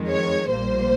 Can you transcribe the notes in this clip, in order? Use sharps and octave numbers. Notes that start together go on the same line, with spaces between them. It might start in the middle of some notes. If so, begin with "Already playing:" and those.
Already playing: F2 D#3 G#3
C#5
A#1 A#2 G3 A#3 C5